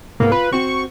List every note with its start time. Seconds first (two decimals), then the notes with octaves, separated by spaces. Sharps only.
0.20 C2 G#2 A#3 B3
0.32 F4 B4
0.53 C4 F#4 C#6